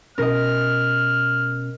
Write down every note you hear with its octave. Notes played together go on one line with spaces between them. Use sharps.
B2 C#4 A#4 D#5 F6